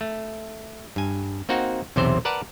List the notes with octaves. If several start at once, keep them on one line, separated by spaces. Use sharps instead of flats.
A3
G2 G#5
A#3 C4 D#4 F#4 F#5
B1 E2 C3 E3 C4 C5
A#4 B4 D5 F#5 A5